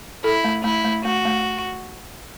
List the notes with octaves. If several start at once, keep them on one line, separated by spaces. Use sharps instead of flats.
E4 A4
A3
A3 E4
A3
A3 F#4
A3